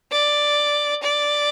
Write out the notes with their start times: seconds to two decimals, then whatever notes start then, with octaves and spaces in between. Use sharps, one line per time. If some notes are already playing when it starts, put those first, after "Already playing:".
0.12 D5
1.03 D5